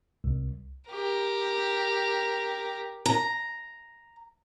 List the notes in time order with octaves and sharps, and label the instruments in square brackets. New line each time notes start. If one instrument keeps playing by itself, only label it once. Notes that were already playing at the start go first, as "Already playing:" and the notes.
[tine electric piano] C2
[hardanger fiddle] G4 A#4
[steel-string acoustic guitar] A#5